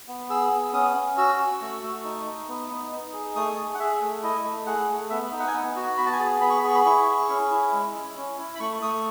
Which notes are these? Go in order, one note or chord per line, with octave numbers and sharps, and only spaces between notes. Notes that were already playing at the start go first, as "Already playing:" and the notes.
B3
G#4 E6
B3
C#4 D#6
C#4
F#4 E6
F#4
A3
A3
D#4
D#4
B3
D#4
D#4
G#4
A3 D#6
G#4
F#5
G#4 E5
A3
E4 D#5
A3
G#4 F#5
A3
B3 E5
D#4
F#5
G#5
B3 F#5
F#4
B3 B5
A5
G#5
G#4 A5
B3 B5
C#6
B5
G#4 C#6
B5
E4 C#6
G#4
C#4
E4
G#3
E4
C#4
E4
B5
A3 C#6
A3 D#6